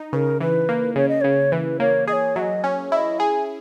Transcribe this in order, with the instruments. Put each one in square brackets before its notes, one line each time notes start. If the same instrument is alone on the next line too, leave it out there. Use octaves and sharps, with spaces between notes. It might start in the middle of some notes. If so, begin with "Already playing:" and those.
Already playing: [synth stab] D#4
[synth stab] C#3 [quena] B4
[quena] A#4
[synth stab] E3 [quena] B4
[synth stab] A#3
[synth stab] C#3 [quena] C#5
[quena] D#5
[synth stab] C#3 [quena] C#5
[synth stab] E3 [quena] B4
[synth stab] A#3 [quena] C#5
[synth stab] G#4 [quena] D#5
[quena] C#5
[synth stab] F#3 [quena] E5
[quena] D#5
[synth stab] C#4
[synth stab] E4 [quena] D#5 E5
[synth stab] G#4 [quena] G#5